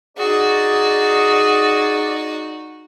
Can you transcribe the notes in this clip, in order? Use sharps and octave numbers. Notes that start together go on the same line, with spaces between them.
D#4 F#4 G#4 D5